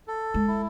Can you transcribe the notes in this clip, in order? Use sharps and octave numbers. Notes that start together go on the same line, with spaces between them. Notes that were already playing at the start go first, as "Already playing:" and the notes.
A4
G#3
E4